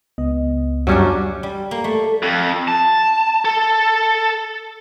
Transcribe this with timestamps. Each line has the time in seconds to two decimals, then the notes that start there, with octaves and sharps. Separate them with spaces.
0.18 C#2 B3 D#5
0.87 F#2 F#3 G3 C#4 D4
1.43 G3
1.71 A#3
1.84 A3
2.23 F2
2.68 A5
3.45 A4